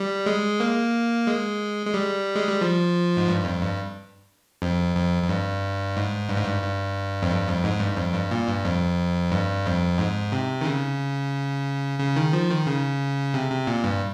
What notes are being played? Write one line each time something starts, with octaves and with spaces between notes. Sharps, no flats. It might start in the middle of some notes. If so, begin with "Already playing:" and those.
Already playing: G3
G#3
A#3
G#3
G#3
G3
G#3
G3
F3
G#2
G2
F2
G2
F2
F2
F2
G2
G#2
G2
G#2
G2
G2
F2
G2
F2
G#2
G2
F2
G2
A#2
G2
F2
G2
F2
G#2
C3
D#3
C#3
C#3
D#3
F3
D#3
C#3
C3
C3
A#2
G2